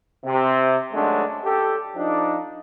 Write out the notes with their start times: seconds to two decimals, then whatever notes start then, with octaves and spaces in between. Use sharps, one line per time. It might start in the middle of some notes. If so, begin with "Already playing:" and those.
0.25 C3
0.93 D#3 F#3 G#3 A3 C#4 D4
1.45 G4 A4
1.95 F3 D4 D#4